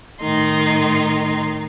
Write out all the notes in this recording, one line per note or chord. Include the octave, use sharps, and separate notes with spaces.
A2 D#3 D#4 C6